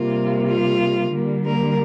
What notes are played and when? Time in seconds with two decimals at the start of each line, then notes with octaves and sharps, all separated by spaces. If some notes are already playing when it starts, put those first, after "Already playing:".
Already playing: C3 G3 A#3 F4
0.48 F4
1.13 D3 G3 A#3
1.45 A#3 A#4